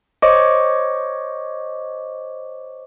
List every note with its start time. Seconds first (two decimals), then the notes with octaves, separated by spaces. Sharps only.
0.22 C5 C#5 D#5 C#6 D6